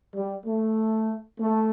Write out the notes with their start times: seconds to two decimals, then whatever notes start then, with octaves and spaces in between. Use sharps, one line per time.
0.13 G3
0.45 A3
1.40 A3